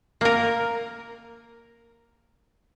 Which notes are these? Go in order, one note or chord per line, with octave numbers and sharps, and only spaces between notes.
A#3 A#4